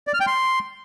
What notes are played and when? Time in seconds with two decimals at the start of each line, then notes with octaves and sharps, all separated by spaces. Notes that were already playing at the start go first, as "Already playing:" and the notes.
0.07 D5
0.14 F6
0.20 G5
0.27 C6